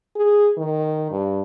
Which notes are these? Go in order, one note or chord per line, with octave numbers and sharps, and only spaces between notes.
G#4
D#3
G2